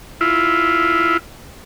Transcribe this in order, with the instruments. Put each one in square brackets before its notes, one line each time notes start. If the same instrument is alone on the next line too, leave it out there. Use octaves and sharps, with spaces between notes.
[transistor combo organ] E4 F4